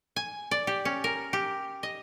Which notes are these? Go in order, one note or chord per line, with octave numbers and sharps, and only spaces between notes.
G#5
D5
G4
C#4
A#4
G4
D#5